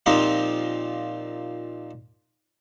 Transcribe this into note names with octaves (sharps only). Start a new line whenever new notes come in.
A#2 F3 C4 D#4 F4 G4